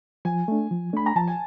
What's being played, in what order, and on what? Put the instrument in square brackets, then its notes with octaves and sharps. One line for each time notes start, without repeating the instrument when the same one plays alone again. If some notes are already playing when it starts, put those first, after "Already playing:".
[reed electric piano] F3 [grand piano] G#5
[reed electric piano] A3 D4
F3
[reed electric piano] A3 D4 [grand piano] B5
[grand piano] A#5
[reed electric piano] F3 [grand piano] A5
[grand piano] G#5